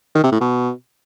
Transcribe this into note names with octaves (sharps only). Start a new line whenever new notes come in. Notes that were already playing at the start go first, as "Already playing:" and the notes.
D#3
C3
A2
B2